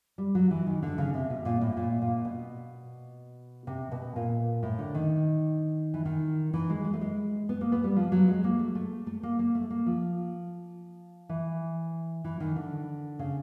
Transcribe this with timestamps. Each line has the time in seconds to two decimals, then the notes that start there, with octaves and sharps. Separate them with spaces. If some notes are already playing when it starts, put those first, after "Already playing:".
0.18 G3
0.35 F#3
0.51 E3
0.66 D#3
0.83 D3
0.98 C#3
1.14 C3
1.30 B2
1.45 A#2
1.61 A2
1.77 A#2
2.02 A#2
2.25 B2
3.67 C3
3.92 B2
4.16 A#2
4.63 A2
4.79 D3
4.94 D#3
5.94 E3
6.05 D#3
6.54 E3
6.70 G#3
6.84 G#3
6.93 A3
7.01 G#3
7.49 B3
7.61 A#3
7.72 B3
7.84 G3
7.96 F3
8.12 F#3
8.28 G#3
8.44 A#3
8.59 A3
8.75 A3
9.07 A3
9.23 A#3
9.39 A#3
9.55 A3
9.70 A#3
9.86 F3
11.29 E3
12.24 E3
12.40 D#3
12.56 D3
13.19 C#3